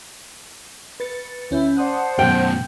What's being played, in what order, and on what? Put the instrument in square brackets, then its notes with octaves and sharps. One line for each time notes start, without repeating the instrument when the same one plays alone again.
[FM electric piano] B4 A6 C#7
[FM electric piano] D2 C#4 G6 [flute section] E4
[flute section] C5 F#5 A5 [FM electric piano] D5 D#6 F#6
[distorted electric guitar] F#2 B2 [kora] G5